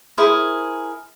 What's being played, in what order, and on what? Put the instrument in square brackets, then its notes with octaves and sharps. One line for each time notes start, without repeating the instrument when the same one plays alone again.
[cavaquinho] E4 G#4 A#4 C5